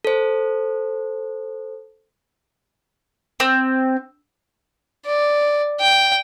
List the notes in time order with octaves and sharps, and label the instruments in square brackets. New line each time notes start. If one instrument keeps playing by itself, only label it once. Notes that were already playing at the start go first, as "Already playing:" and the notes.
[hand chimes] A4 C5
[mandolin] C4
[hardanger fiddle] D5
G5